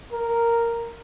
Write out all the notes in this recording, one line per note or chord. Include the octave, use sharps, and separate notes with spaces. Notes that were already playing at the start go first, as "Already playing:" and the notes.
A#4